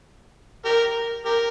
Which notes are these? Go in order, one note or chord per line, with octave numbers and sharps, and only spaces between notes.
G4 A#4
G4 A#4